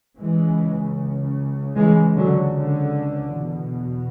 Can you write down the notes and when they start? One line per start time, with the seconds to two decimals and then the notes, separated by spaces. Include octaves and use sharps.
0.21 C#2 C#3 E3 G#3
1.77 E3 G#3
2.15 D3 F#3
2.55 D3
3.33 E2 B2